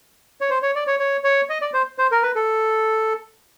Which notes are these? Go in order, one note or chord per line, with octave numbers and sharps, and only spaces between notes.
C#5
C5
C#5
D5
C#5
C#5
C#5
D#5
D5
C5
C5
A#4
B4
A4